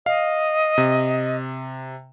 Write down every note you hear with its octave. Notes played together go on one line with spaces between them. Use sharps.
D#5 F5
C3